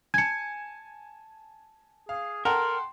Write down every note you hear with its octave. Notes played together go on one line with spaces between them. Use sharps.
G#5 A5 G#6 C#7
G#4 F5
A4 A#4 F#5 G5 C6